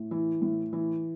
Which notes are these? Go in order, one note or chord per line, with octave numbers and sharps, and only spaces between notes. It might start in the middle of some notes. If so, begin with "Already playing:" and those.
Already playing: A2
E3
A2
E3